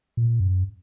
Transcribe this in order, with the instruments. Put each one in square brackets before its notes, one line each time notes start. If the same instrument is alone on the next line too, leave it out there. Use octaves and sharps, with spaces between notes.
[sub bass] A#2
F#2